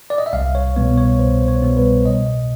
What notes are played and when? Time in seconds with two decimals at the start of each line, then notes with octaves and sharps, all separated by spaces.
0.10 D5
0.18 D#5
0.26 E5
0.33 C2 F5
0.55 C#5
0.76 B2 G3 B3 C#5
0.97 C#5
1.19 C2 C5
1.41 C5
1.48 C#5
1.62 B2 G3 B3
1.77 B4
2.05 B2 D#5
2.27 D#5